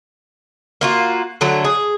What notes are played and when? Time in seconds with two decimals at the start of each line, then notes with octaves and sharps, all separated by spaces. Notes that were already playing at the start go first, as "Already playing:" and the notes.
0.81 A#3 F4 F#4
1.41 D3 F#3 A3
1.64 G#4